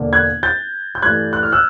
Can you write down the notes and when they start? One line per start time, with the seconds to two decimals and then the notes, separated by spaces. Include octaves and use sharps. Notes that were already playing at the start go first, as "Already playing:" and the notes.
Already playing: E1 D3 A#3
0.13 F#6 G#6
0.43 G6 A6
0.95 G6
1.02 G2 E3 A3 F#6 G#6
1.33 F#6
1.43 F6
1.52 E6 F#6